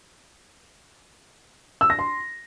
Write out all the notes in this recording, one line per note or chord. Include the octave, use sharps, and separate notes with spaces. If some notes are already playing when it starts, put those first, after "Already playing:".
E6
A#6
C6